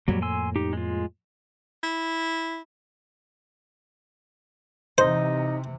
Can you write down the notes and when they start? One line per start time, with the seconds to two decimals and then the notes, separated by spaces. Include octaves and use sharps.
0.08 F2 A2 F#3 G3 A#3
0.22 G#5 C6 E6
0.56 D#4 G4
0.73 G#3 F4
1.83 E4
4.98 C3 E3 D#4 C5 D#5